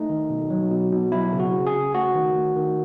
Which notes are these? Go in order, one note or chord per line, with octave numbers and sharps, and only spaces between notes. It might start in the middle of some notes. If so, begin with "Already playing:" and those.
Already playing: A3 D#4
D#3
B2
F#3
B2
B2
F#3 E4
C#3
F#4
C#3
G#4
C#3
A3 F#4
D#3
A3
D#3